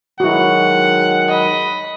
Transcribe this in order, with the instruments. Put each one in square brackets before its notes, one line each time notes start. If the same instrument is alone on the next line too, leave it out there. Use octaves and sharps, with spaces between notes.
[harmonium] D#3 F#3 G#3 [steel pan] E4 F#4 [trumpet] F#5
[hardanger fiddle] D#5 B5